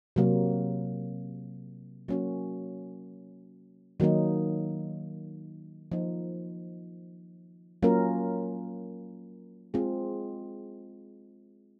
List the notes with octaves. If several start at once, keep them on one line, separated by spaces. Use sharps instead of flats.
C3 F#3 A#3
F#3 A#3 C#4 F#4
D#3 F#3 A#3 D#4
F3 A#3 D#4
F#3 A#3 C#4 F4 A#4
G#3 C4 F4 G#4